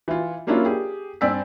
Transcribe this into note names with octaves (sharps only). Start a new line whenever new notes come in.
E3 F4
F#3 A#3 C#4 D4 E4 F4
G4 G#4
G2 C4 D5 G#5 E6 B6